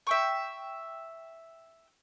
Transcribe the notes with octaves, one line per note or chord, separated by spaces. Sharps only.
E5 G5 C#6